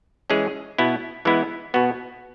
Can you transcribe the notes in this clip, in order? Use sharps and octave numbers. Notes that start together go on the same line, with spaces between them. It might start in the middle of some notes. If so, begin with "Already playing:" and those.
E3 G#3 C#4 G#4
B2 B3 E4
E3 G#3 B3 E4
B2 B3 F#4